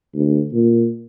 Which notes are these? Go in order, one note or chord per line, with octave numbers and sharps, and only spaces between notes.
D2
A#2